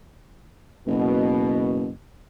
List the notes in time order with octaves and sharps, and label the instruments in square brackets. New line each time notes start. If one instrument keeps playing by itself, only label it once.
[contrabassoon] F#1 [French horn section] B2